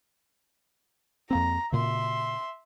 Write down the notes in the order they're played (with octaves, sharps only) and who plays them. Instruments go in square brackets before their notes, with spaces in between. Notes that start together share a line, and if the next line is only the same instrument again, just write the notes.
[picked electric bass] F2 A#3 C4 [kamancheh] A#5
[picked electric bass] A#2 C#3 [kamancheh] E5 C6